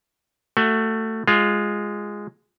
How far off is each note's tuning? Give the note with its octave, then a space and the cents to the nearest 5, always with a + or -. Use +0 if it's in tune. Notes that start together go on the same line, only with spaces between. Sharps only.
A3 +15 F#4 +10
G#3 -5 F4 +5